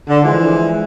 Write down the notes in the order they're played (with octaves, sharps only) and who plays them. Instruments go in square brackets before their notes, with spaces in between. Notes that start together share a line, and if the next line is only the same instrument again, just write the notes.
[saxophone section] D3
E3 F3 G#3